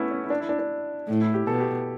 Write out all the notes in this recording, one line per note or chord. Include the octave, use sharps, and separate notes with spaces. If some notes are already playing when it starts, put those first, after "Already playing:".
Already playing: A3 B3 C#4 E4
C#4
E4
D4
E4
D4
D4
A2
E4
G4
B2 A4
G4